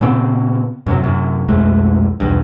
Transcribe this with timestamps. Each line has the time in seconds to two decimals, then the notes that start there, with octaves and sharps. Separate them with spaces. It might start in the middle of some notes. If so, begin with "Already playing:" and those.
0.01 A#2 C#3 B3 C4
0.86 F#2 C3 F#3
1.03 F#2 C3
1.48 B1 F2 G#3 A3
2.20 B1 E2 G2